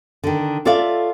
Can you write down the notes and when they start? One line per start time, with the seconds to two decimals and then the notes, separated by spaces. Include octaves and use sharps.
0.24 D3 D#3
0.65 F4 A4 C#5 D5 E5 F5